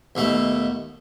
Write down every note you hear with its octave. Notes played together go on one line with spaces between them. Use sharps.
D#2 B2 A3